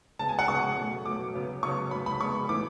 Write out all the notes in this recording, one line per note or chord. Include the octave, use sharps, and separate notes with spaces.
C#3 G#3 B3 A5
G#5
F#5
C#3 G#3 B3 C#6
B2 F#3 A3
B2 F#3 A3 D6
C#3 F#3 B3
C#3 F#3 B3 C#6
C#3 G#3 B3 B5
B5
C#3 G#3 B3 C#6
A2 E3 B3 D6